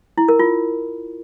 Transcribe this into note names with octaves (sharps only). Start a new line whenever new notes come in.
E4
A#4
F4